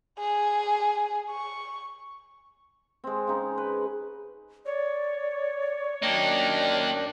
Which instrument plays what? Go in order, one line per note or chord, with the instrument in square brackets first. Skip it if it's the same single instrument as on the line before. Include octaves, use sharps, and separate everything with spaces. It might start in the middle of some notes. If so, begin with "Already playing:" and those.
[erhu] G#4
C#6
[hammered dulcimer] G#3 C4
C#3 D#4
B4
[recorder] C#5 [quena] D5
[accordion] F#2 D4 D5 [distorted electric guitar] A#3 D#4 [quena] G5